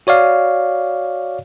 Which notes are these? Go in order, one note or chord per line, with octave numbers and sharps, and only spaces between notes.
F#4 C#5 D5 F5